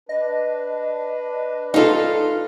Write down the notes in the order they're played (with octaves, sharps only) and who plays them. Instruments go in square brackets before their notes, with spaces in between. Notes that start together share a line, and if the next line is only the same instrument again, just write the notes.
[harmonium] D4 B4 [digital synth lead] D#5
[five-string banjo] D#4 A4 [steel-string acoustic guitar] F4 F5